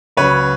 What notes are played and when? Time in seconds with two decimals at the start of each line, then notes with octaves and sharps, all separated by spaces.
0.17 C#2 C#3 F#3 B4 C#5